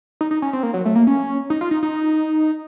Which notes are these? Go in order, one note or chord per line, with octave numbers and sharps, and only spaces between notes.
D#4
D#4
C#4
C4
A#3
F#3
A3
A#3
C#4
D#4
F4
D#4
D#4